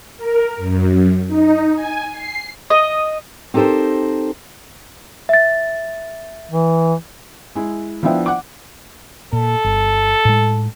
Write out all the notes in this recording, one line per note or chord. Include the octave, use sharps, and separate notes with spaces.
A#4
F#2
D#4
G#5
C7
D#5
C4 D#4 G4 A4 A#4 C5
E5 A6
E3
G#3 E4
F3 B3 D4 E4 E5 G5
F#5 D6
A#2 A4
G1
A2 G#3